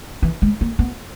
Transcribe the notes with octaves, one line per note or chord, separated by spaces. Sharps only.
E3
G#3
A#3
B3